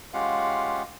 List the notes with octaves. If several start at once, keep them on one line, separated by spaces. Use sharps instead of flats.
G#3 C#4 F4 G4 F5 F#5